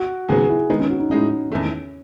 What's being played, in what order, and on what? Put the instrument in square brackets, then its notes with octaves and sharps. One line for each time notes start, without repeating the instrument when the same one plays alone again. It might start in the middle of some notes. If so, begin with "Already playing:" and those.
Already playing: [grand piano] F#4
[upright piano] D#2 C#3 F#3 B3 [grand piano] G#4
[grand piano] E4
[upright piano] D#3 G#3 B3 [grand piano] D#4
[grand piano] C#4
F#4
D#4
[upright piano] A2 G#3 D#4 [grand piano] C#4
[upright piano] E2 D#3 A3 [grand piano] C#4